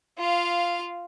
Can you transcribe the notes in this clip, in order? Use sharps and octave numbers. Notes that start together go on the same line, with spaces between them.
F4 F5